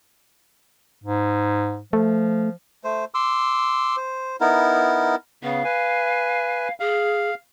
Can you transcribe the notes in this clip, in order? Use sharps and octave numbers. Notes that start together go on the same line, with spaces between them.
G#2
F3 A3
A3 C5
C6 D6 E6
C5
B3 D#4 E4 A#4
C#3 B3 F5
B4 G#5
G#4 F5